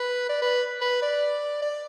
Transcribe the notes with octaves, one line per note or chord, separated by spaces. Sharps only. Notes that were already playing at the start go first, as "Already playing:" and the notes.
Already playing: B4
D5
B4
B4
D5
D5